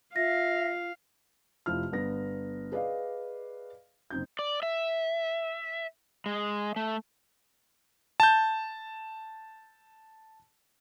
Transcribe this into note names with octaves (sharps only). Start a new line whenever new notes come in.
F4 E5 F5 A#6
F1 F3 E4 F6
G1 B3 A#6
G#4 B4 D5 D#5 F5
F#1 C4 D#4 G6
D5
E5
G#3
A3
A5 G6